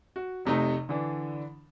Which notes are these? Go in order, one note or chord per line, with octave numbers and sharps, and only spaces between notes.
F#4
F1 C3 A3 D#4
D3 E3 D4